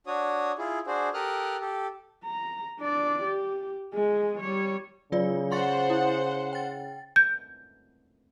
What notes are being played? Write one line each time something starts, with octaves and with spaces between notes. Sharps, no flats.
D4 F#4 C#5 D#6
E4 F4 G#4
D4 F#4 G#4 C5
G4 A4 A#4 D#6 F6 F#6
G4 A4
A#5
D4 D5
G4
G#3 G#4
G3 C#5
C#3 F#3 F4 D5
C5 F#5 C6 C#6 A6
E4
G5 A6
G6